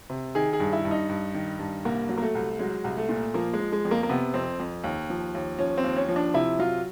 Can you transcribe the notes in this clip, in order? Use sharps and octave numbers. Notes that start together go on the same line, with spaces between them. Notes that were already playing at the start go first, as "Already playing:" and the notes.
C3
D#3 G#4
G#4
G2
E4
G2
D#4
G2
D#3
G2
C2 A#3
F#3
A#3
A3
C2
F#3 G#3
C2
A3
A#2
F3 A#3
G#3
F3
G#3
F2
A#3
A#3
C3 B3
F2 C4
F2
D#2
F3
D#2
F3 C#4
C4
D#2
C#4
F3
D4
C3 E4
F#3 F4